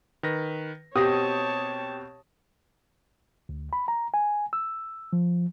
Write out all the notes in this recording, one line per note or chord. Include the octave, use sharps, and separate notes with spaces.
D#3 B4 A#6
B2 C4 G4 C#5 A5 D#6 A#6
D2
B5
A#5
G#5
E6
F3